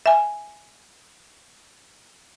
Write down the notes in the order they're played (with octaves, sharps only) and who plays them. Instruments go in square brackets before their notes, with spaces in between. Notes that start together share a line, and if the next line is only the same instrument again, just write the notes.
[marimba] E5 G#5